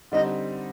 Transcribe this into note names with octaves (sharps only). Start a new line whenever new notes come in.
D3 G3 C4 D#4 D#5